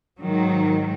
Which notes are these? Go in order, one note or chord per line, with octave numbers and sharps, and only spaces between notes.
G#2 D#3 F#3